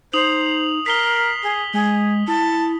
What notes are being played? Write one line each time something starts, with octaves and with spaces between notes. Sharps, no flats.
D#4 C5 D#6 F7 F#7
A#4 B6 C7 G7
G#4
G#3 G#4
E4 A5